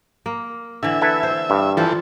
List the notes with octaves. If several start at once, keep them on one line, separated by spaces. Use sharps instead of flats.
A#3
D3 E3 E5
E4 A4 B4
C5
G2
E3 F3 F4 A4 C5